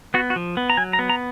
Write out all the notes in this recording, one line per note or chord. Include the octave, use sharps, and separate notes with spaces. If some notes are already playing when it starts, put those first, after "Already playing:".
B3 F#4
F#4
F3
B3
A#5
F#3 G#5
A#5
B3
A#5